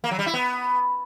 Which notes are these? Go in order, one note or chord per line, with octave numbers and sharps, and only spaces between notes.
A#3
F#3
G3
E4
B3